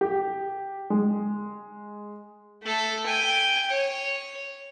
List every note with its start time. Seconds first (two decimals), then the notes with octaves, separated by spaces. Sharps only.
0.01 G4
0.90 G#3
2.63 A3 A4
3.06 G5 G#5
3.70 C#5